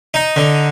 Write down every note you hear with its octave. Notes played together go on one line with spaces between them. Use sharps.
D#4
D3